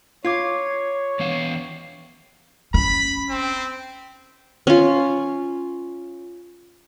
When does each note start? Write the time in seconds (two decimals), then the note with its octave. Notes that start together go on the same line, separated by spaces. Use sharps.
0.25 F4 C#5 D6 G#6 C7
1.20 E3 B3 F5
2.74 C#4 B5
3.30 C4
4.67 C#4 F4